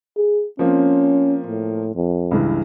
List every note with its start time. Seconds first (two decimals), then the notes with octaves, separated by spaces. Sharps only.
0.17 G#4
0.59 F3 A#3 C4 C#4
1.47 A2
1.96 F2
2.31 C#2 G2 E3